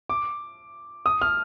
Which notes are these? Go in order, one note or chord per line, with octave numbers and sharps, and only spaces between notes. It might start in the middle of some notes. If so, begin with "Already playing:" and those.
D6
D#6
F6